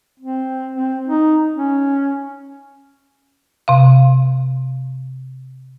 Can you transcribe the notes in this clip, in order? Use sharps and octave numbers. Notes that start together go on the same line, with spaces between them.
C4
C4
D#4
C#4
C3 F5